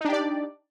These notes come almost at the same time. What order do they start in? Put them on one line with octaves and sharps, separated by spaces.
D#4 D4 G4 D5